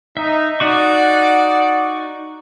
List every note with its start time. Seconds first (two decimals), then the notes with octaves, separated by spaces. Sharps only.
0.17 D#4 E5
0.60 D#4 F#4 D5 F#5 C#6